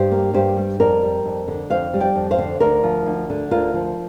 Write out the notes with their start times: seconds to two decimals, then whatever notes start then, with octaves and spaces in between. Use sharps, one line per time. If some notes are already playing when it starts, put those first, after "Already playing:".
Already playing: G2 G4 C5
0.11 A#3
0.33 G2 G4 C5
0.57 G3
0.80 F2 A#4 D5
1.03 G3
1.26 F2
1.48 D3
1.70 F2 C5 F5
1.94 G3
2.00 D5 G5
2.15 F2
2.31 C5 F5
2.39 D3
2.60 D2 A#4 D5
2.83 F3
3.06 D2
3.30 D3
3.51 D2 F4 A#4
3.74 F3